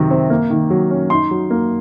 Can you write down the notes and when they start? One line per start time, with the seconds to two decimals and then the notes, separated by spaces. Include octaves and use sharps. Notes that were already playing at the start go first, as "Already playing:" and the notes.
Already playing: C3 D#3 F#3
0.11 C4
0.30 A#3
0.50 D#3
0.70 F#3
0.91 C#4
1.10 D#4 C6
1.31 F#3
1.50 A#3